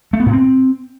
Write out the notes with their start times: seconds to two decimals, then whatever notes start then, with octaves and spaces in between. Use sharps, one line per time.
0.13 A3
0.20 B3
0.26 A2
0.33 C4